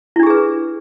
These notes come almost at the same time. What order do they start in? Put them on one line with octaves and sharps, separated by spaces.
E4 D4 G4 G#4 B4